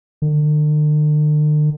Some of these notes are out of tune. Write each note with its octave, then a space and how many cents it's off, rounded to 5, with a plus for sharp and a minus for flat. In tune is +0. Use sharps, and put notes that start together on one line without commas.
D3 +45